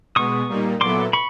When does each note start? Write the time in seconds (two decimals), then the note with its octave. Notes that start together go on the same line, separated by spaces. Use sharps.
0.16 B2 G#3 B3 C#6 D#6
0.49 A#2 G3 A#3 D#4
0.81 A#2 F#3 B3 E4 A4 C6 D6
1.13 B5 C#6